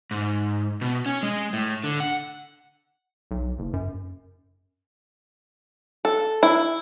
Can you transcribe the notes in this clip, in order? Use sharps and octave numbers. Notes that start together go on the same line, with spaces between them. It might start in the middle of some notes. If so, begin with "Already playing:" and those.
G#2
B2
C#4
G#3
A2
D3
F#5
B1
F#1
F#2
A4
E4